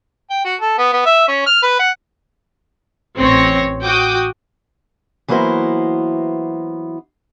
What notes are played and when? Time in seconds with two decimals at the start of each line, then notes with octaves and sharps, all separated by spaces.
0.30 G5
0.45 F#4
0.61 A4
0.78 B3
0.93 B3
1.06 E5
1.28 C#4
1.46 F6
1.63 B4
1.79 F#5
3.17 A1 C4 C#5 A#6
3.83 F#4 G5 D6 D#6
5.28 E3 F#3 A#3 B3 E4 C5